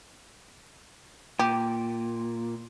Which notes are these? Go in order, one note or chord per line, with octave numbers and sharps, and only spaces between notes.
A#2 G4